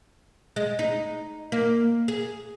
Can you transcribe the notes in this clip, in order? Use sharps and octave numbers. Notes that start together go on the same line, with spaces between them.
G#3
D#4
A#3
G#4